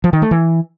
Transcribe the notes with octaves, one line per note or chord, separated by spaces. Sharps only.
F3
D#3
A3
E3